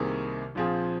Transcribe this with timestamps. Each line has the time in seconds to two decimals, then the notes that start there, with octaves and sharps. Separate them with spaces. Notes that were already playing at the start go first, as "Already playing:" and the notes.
Already playing: C2 C3 D#3 A#3 G#4
0.55 A#1 A#2 F3 C4 G#4